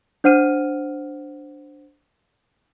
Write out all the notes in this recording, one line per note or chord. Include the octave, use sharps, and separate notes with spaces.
D4 C5 F#5 F6 D#7